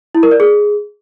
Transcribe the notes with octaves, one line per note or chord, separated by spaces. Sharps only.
E4
A#4
D5
G#4